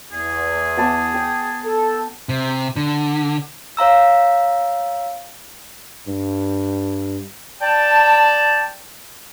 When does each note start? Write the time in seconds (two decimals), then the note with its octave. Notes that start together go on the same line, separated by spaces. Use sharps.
0.12 E2 G#4
0.77 B3 A5 D6
1.14 G5
1.65 A4
2.29 C3
2.76 D3
3.77 C#5 F5 A#5 E6
6.08 G2
7.61 D5 G5 A5